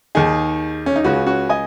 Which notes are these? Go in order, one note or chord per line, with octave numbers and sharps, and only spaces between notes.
D#2 D#3 D#4 G#4
C#4
D#4
C#2 C#3 C#4 F#4
C#4 F#4
D#5 G#5